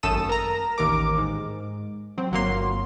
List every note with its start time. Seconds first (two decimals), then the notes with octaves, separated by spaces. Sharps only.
0.03 G#1 F#2 A3 A4 D#6 E7
0.29 A#4 A#5
0.78 A1 D#2 A#4 D6
1.18 G#2
2.18 F#3 C4
2.31 G1 F#3 A#3 C6